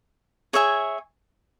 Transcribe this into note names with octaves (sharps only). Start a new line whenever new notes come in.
G#4 C#5 E5 G#5